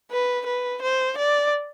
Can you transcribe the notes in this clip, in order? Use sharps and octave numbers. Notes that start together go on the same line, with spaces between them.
B4
B4
C5
D5